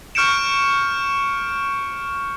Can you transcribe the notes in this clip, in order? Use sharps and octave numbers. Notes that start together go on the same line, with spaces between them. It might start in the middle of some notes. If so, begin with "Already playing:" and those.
C#6 F6 G6 C#7 D7 E7